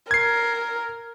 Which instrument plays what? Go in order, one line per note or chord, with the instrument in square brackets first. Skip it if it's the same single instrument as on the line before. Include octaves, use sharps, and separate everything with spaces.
[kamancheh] A#4 [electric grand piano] G#6 C7